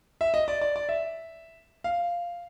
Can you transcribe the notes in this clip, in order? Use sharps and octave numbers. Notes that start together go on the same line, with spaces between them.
E5
D#5
D5
D5
D5
E5
F5